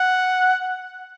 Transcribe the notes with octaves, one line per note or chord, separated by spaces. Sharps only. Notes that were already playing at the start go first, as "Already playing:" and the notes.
Already playing: F#5